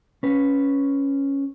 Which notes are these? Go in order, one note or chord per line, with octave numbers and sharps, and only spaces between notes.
C#4 B4